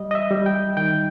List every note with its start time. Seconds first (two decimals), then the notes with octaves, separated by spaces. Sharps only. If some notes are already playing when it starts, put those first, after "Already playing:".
Already playing: G3 D#5
0.11 D#5
0.15 E5
0.31 G3
0.46 G5
0.77 D#3 G5